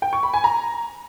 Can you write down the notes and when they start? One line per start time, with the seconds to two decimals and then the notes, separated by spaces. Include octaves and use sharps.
0.02 G5
0.13 C#6
0.23 B5
0.34 G#5
0.44 A#5